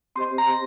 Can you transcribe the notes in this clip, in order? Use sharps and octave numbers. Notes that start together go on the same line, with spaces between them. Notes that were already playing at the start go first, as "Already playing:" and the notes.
C4 G4 C5 D#5 C6
A#5